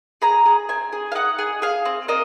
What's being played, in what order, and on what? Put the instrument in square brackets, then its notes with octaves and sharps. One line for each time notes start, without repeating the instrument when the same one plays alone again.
[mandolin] G#4 A#5
G#4
C4 G#5
G#4
F5
D#4 F#5
G#4
G#4 F5
C4
A#3 D#5